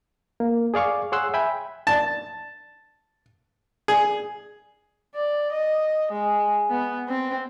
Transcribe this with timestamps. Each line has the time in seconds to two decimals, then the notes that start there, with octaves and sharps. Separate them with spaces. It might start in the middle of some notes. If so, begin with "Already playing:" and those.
0.40 A#3
0.74 G#4 D5 F5 C#6 D6
1.12 G#4 C#5 F#5 C6 E6 F#6
1.34 E5 G5 G#5 B5
1.87 A5
3.88 G#4
5.15 D5
5.52 D#5
6.11 G#3
6.70 B3
7.09 C4